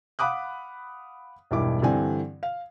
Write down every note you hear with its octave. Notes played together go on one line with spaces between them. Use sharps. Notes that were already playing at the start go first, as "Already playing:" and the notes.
F5 F#5 B5 D6 D#6 F#6
E1 B1 G2 E4 D6
G2 D3 E3 C4 G#5
F5